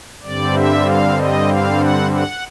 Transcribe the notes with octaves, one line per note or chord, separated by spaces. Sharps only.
G2 D3 G3 C4 D5
E5
F5
D#5
F5
F#5
F#5